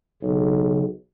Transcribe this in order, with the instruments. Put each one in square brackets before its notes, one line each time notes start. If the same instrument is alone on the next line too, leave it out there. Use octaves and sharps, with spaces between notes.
[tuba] B1 [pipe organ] C#3